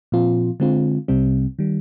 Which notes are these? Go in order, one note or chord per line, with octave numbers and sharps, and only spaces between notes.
A#2 F3 C4 F4
D3 G#3 C4 F4
C2 C3 G3 C4
D#3 G3